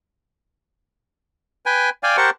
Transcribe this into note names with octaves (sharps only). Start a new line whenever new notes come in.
B4 G5 G#5
D5 F5 G5 G#5
G4 A#4 C5 F#5 A5 C#6